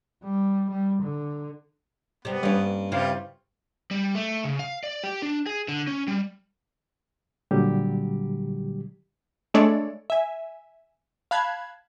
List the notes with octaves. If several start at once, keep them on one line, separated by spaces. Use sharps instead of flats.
G3
G3
D3
C3 G3 B3
G2 A#3 C#4
C#3 G3 C4 E4 F4 F5
G3
A3
C#3
F5
D5
G4
D4
G#4
D3
C#4
G3
A#2 D3 F#3 G3 G4
G#3 A3 D4 A4 C#5 D5
E5 G#5
F5 A5 B5 F#6 G#6